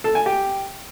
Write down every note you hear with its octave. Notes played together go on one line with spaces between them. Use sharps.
A4
G#5
G4